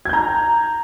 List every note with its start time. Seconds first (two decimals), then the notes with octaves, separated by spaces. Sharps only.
0.05 G#6
0.09 G6
0.13 A#5